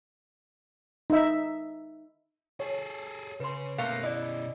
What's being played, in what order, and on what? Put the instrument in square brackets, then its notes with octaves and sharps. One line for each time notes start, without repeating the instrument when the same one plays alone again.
[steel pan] D#4 E5
[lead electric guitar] G#4 A4 [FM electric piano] C#5
[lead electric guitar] C#3 [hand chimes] B4 C6
[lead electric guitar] B2 C#4 [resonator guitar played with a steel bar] A3 A#3 F5 [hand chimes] F#6
[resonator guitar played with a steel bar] E4 [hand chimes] D5 D#5